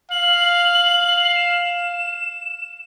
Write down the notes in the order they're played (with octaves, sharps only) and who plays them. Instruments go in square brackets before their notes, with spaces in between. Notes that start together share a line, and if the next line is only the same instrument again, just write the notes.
[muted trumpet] F5 [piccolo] F#7
[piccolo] E7